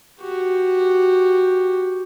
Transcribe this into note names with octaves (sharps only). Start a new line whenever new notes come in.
F#4 G4